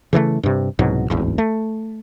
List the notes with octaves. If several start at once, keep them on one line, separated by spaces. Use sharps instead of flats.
C#3 E3 F#3 A3
G2 C3
C2 G#2 B2 F#3
D1 G#1 E2
A3